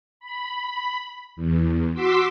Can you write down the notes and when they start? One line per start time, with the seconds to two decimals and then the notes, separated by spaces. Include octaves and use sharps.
0.20 B5
1.36 E2
1.94 F#4 C6 D6 E6 B6